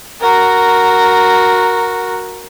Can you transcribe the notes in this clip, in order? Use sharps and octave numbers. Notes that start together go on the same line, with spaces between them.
F#4 A#4